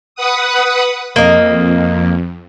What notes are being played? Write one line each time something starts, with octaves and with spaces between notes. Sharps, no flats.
B4 F#5 D#6
F2 A#3 D#5